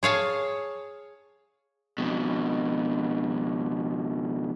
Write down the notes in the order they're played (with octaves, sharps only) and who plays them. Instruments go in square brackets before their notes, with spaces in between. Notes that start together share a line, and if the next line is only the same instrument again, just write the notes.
[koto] G#4 C#5 F5 A5
[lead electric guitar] F2 B2